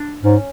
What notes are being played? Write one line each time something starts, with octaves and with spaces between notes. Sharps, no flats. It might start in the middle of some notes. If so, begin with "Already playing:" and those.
Already playing: D4
G#2 C#4